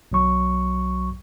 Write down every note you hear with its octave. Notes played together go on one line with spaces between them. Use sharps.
B1 F#3 C#6